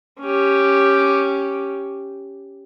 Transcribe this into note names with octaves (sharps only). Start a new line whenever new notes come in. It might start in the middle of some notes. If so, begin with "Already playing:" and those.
C#4 G4